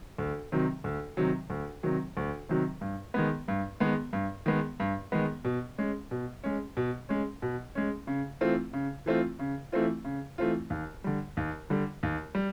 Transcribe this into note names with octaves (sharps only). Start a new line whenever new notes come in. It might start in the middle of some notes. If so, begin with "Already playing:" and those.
D2
C3 D#3 F#3
D2
C3 D#3 F#3
D2
C3 D#3 F#3
D2
C3 D#3 F#3
G2
D#3 G#3 B3
G2
D#3 G#3 B3
G2
D#3 G#3 B3
G2
D#3 G#3 B3
B2
G#3 C#4
B2
G#3 C#4
B2
G#3 C#4
B2
G#3 C#4
C#3
E3 A3 C4 F4
C#3
E3 A3 C4 F4
C#3
E3 A3 C4 F4
C#3
E3 A3 C4 F4
D#2
D3 G3
D#2
D3 G3
D#2
G3